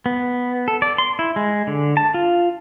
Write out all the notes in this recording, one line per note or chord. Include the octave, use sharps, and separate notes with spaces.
B3
A4
D5
C6
E4
G#3
D3
A5
F4